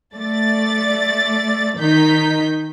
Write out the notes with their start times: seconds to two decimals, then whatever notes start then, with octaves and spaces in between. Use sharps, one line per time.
0.14 A3 D5 A6
1.79 D#3 D#4 G6 B6